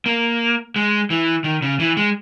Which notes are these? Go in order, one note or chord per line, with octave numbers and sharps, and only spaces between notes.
A#3
G#3
E3
D#3
C#3
E3
G#3